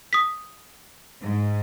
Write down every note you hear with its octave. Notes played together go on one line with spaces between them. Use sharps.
D#6 B6
G#2